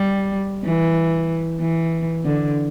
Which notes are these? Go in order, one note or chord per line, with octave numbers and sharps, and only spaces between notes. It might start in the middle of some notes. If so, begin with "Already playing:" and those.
Already playing: G3
E3
E3
D3